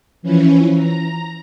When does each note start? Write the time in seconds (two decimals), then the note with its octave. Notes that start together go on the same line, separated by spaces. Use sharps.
0.22 E3 F3 C#4 E4
0.76 A#5